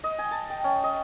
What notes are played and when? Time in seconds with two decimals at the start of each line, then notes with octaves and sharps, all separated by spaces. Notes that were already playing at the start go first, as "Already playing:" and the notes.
0.04 D#5
0.19 G#5
0.31 A5
0.50 G5
0.64 C#4
0.84 D#5